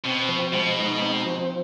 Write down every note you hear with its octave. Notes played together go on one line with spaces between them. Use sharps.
B2 C4
F3
B2 G#3
D#4
C4
F3